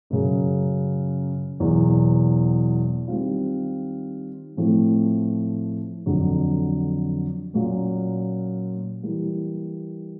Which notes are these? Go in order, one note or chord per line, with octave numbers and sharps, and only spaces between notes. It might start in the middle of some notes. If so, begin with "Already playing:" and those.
F#2 C#3 F#3
E2 B2 F#3 A#3
D#3 G3 C4 F4
A2 F3 A3 C4 E4
F2 D3 F#3
A#2 F#3 A#3 C#4 F4
E3 G3 A#3